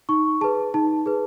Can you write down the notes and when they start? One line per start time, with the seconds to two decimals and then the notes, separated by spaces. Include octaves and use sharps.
0.09 D#4 C#6
0.41 G#4 B4 A5
0.74 D#4 A5
1.06 G#4 B4